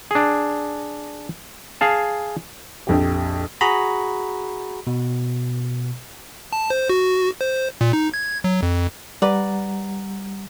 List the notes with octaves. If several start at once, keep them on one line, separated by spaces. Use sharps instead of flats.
D4 G#4
G#4 F5 A5
A#1 F2 G4
F#4 G#4 A#5 B5
B2
A5
C5
F#4
C5
A#2
D#4
G#6
F#3
F2
G3 B4 D5 F#5 A#5